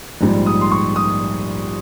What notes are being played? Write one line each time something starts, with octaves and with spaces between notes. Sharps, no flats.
A#1 G#2 G3
D#6
C6
C#6
D#6